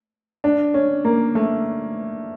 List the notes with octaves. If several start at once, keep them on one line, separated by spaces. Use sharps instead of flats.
D4
C#4
A#3
A3